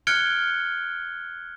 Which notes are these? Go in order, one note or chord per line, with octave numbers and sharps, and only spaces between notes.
F6 F#6 G#6 C#7 D7 G7